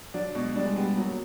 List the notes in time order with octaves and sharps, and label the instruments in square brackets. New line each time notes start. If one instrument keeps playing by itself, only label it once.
[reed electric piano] F#3 [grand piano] D4
[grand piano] B2 [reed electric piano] G#3
[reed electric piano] G3 [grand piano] D4
[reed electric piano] G#3
[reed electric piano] G3 [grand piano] B3
[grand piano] F#3 [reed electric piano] A#3